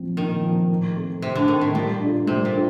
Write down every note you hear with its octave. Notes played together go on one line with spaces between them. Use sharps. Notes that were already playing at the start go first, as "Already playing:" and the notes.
Already playing: A#2 F3 C4
A#2 D#3
F3 C4
A2
A3 C4
A2 C3
D3
D#3 A3 C4
A2
A#2 G3
D4 F4 A4
C3 G3
A#2
D4 F4 A4